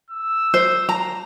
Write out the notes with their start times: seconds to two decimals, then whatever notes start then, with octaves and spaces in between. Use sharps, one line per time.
0.11 E6
0.54 C5
0.89 A#5